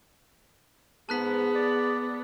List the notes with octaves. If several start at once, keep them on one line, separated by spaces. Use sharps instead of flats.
G#2 B3 G#4 A5 F#6 B6
D5